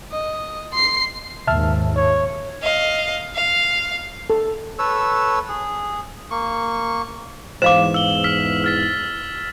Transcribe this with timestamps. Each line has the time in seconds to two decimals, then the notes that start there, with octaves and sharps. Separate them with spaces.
0.12 D#5
0.73 C6 C7
1.47 D#2 G#2 E5 A5 F6
1.96 C#5
2.62 D#5 F5
3.35 F5
4.30 A4
4.79 A4 B4 C#5 E6
5.49 G#4
6.31 A#3 C#6
7.62 E2 G#2 E3 C5 F5 D6 E7
7.94 E6 G7
8.24 E6 F6 B6
8.64 F6 A6 B6